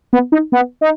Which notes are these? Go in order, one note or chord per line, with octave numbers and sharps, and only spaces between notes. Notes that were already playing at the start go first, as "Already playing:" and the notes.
B3
D#4
B3
D#4